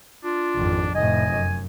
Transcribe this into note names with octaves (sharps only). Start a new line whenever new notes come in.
D4 F4
G#1 F2
F1 A2 D#5 G#5
F#2